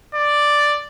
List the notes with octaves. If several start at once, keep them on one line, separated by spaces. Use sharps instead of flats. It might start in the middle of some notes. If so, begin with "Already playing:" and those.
D5